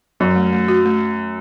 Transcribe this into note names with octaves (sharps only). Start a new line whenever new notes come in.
F#2 F#3
A3
A3
F#4
A3